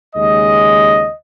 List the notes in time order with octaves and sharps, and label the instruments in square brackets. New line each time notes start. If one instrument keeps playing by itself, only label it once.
[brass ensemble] D#2 C#3 G#3 D#5